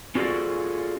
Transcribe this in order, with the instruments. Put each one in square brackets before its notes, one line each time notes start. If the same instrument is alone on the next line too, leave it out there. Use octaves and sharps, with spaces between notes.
[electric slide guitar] C#4 F4 F#4 G#4 A4 D5